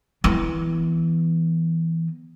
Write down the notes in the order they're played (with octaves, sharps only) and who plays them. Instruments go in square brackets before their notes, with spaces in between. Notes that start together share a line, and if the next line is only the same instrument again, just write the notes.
[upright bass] E3 B3